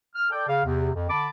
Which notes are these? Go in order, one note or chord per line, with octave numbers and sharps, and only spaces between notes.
F6
A4 D5 G5
C#3 F5
E2 C3
F2
D3 A5 B5 D6